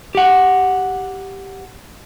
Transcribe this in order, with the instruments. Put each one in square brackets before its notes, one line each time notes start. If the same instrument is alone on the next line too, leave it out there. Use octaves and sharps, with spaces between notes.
[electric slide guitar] G4 F#5